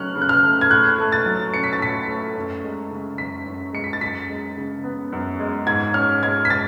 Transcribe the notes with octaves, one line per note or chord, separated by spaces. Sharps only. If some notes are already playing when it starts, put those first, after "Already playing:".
Already playing: C#3 F#3 A3 C#4 F6 F#6
C#3
F#6
F6
A3
G#6
A2 F#6
A3
A6
F#3
C#4 C#7
B6
A6
A2 B6
A3
F#2
G#3
C#3
F#2 B6
F#2
G#3 C#7
B6
A6
F#2 B6
G#3
C#3
B3
F#2
G#3
G#2 G#6
C#4 F6
G#3 G#6
B6
A6